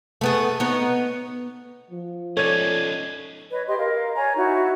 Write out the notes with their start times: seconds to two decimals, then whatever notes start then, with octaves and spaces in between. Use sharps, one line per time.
0.21 A3 B3 G#4
0.60 B3 D#4 C#5
1.91 F3
2.37 C#4 D#4 A4 C#5 D5 G#6
3.51 B4 C#5 D#5
3.66 G4 D#5 C6
3.78 A#4 F5
4.16 C#5 D5 G#5 A#5
4.37 D#4 E4 F#4